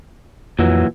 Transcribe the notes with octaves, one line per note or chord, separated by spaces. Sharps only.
F2 A#2 E3 F#3